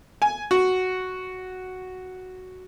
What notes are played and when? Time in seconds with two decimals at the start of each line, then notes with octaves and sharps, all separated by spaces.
0.22 G#5
0.51 F#4